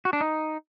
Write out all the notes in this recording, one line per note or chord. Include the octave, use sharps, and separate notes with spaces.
F#4
D4
D#4